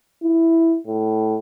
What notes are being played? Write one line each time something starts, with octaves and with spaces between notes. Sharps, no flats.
E4
A2